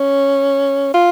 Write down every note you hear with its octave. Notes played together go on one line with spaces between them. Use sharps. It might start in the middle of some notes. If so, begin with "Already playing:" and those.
Already playing: C#4
F4